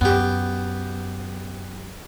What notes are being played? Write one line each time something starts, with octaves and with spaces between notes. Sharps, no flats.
F#2 B3 G4